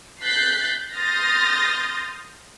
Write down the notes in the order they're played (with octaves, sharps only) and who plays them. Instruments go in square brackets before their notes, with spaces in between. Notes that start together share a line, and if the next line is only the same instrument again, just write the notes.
[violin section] F#6 G6 A6 B6 C7
C6 D#6 F6 G6 A6 A#6